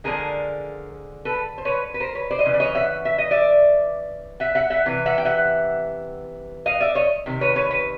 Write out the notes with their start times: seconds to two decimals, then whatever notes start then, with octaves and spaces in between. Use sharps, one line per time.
0.04 D3 F3 G#3 G#4 A#4
1.25 A4 B4
1.58 C5
1.65 B4 C#5
1.94 B4
2.00 A#4 C5
2.15 B4 C#5
2.31 C5 D5
2.39 D#5
2.45 C#3 E3
2.54 D5
2.60 C#5 D#5
2.75 E5 F#5
3.05 E5
3.18 D#5
3.31 D5 E5
4.40 E5 F#5
4.55 E5 F#5
4.70 E5 F#5
4.86 C3 E3
5.06 E5 F#5
5.18 G5
5.25 E5 F#5
6.66 D#5 F5
6.80 D5 E5
6.95 C#5 D#5
7.26 C3 D#3
7.41 B4 C#5
7.55 B4 C#5
7.70 B4 C#5